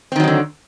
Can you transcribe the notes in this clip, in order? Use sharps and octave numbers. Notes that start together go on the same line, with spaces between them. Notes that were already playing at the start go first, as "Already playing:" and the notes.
D3 D#3 F#3 G#3 C4